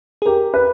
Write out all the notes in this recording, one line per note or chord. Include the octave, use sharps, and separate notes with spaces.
G#4
G4 A#4
B4